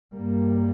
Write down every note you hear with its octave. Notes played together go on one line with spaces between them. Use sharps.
G2 G3 A#3